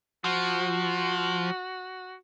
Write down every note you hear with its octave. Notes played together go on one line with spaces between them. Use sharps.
F3 F#4